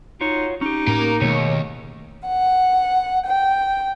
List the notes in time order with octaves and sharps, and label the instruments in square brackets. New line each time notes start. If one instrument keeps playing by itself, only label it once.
[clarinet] D#4 [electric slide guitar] F4 F#4 C#5
[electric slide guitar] C#4 G4 [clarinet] D#4
[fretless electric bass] A2 [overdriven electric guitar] A#3 A#5
[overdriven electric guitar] D#2 [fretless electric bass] B2 A3 [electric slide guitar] G#4 C#5
[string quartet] F#5
G5